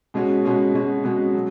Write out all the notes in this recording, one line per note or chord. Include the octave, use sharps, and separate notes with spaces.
B2 G#3 C#4 F#4
B2 G#3 C#4 F#4
B2 G#3 C#4 F#4
B2 G#3 C#4 F#4
F#3